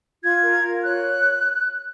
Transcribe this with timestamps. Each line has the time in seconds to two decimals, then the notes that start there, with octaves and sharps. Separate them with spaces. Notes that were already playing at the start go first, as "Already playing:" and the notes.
0.23 F4 G#6
0.43 A#4
0.63 F4
0.84 C#5 F#6